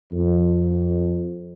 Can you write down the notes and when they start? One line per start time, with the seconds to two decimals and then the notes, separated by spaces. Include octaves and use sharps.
0.13 F2